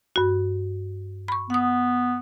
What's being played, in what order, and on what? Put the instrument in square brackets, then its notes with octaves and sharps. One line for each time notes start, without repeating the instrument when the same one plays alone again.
[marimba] G2 F#4
B5 C#6
[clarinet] B3 [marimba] F#5 D#6